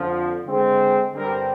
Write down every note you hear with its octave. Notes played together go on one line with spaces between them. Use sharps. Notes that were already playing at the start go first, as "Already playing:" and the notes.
Already playing: F2 D3 F3
D3 G#3 C4
G2 D3 G3 C4 A#4